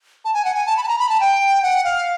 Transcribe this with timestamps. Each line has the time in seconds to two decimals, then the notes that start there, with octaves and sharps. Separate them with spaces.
0.25 A5
0.34 G#5
0.45 F#5
0.55 G#5
0.66 A5
0.77 B5
0.83 A5
0.88 A#5
0.99 B5
1.09 A5
1.20 G5
1.63 F#5
1.84 F5